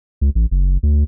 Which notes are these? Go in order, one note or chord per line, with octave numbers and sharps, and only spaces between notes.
C#2
A1
F#1
D2